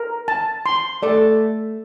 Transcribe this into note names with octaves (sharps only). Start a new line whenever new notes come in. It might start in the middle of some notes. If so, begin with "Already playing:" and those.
Already playing: A#4
A5
C6
A3 A4 D5